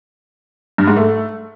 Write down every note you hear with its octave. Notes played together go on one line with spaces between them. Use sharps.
G2
G#2
A3